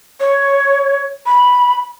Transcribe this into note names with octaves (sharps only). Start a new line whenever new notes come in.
C#5
B5